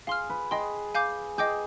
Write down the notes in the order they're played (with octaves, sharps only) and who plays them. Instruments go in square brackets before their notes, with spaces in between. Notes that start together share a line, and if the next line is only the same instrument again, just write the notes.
[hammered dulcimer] G#4 [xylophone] F5 C6 F6
[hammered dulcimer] B4
[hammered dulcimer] G#4 [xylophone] D#5 G5 C6
[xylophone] F5 G#5 D6 G6
[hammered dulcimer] G#4 [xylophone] D#5 G5 D6 G6